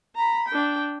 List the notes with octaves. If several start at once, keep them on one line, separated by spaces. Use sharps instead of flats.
A#5 B5
D4 G5